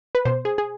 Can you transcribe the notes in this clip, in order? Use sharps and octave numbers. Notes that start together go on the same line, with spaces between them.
B4
B2 C5
G#4
G#4